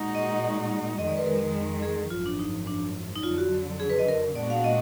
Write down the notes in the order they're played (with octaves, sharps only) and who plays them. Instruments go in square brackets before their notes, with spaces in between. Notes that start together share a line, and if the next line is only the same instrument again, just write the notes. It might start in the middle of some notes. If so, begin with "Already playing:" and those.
Already playing: [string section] A#2 G#3 D#4 F#4
[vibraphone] D#5
[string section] F2 D#3 G#3 [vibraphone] D#5
[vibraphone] D5
B4
A#4
G#4
[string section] G#1 F#2 F3 [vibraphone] F4
[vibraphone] D4
D#4
D4
D#4
[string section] F2 D3 F#3 [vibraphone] F4
[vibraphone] F#4
G#4
B4
D#5
A#4
[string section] A#2 G#3 B3 D4 F#4 [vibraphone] D5
[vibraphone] F5
D#5